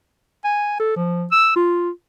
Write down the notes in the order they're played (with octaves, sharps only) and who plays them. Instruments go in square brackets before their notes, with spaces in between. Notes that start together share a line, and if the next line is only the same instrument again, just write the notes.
[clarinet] G#5
A4
F3
E6
F4